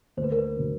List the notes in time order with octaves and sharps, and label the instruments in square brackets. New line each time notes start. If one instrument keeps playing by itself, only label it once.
[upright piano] D2 [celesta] C5
[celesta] B4
A#4
B4
[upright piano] D3 F#3